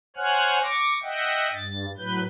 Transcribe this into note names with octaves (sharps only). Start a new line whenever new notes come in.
C5 C#5 F#5 G#5 F6 F#6
C#6 D6 A#6
D#5 E5 F#5 G5
G2 A6
A2 F#3 B4 G6